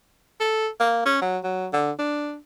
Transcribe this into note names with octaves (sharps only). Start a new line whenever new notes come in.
A4
A#3
C#4
F#3
F#3
D3
D4